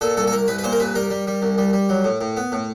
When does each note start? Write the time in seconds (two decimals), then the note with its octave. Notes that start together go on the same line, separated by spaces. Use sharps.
0.01 A#2 A4
0.17 C2 A4
0.27 A4
0.32 C2 A#4
0.48 C2 B4
0.58 B4
0.64 A#2 C5
0.72 A#4
0.80 C2 B4
0.95 G3 A#4
1.10 G3
1.27 G3
1.42 C2
1.58 G3
1.73 G3
1.89 F#3
2.04 A2
2.21 A2
2.37 B3
2.52 A2